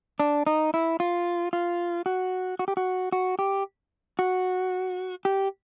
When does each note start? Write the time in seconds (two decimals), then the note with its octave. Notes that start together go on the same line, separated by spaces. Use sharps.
0.20 D4
0.47 D#4
0.74 E4
1.00 F4
1.53 F4
2.06 F#4
2.59 F#4
2.68 G4
2.77 F#4
3.12 F#4
3.39 G4
4.19 F#4
5.25 G4